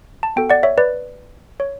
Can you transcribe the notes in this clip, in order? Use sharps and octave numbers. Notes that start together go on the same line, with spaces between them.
A5
B3 F#4 A4 G5
D5 F#5
C#5 E5
B4 D5
C#5